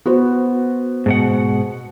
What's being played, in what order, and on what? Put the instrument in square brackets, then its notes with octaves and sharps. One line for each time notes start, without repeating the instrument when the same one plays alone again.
[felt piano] B3 F#4 C5
[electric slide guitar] G#2 B2 F#5